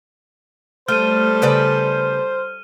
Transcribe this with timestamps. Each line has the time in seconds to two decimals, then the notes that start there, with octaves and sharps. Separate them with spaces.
0.88 G3 A3 A4 C5 F6 D#7
1.42 C#3 B4 D5